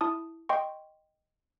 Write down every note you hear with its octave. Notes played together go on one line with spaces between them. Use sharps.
E4 A5 D#6
D#5 G5 C6 C#6